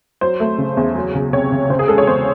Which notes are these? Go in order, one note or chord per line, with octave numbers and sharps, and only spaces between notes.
F#3 C5
A3
C#3
E2
F#3
C#2
C3 C#5
C#2
C#3 C5
G#4
G#3 A4
C#5
E2 C5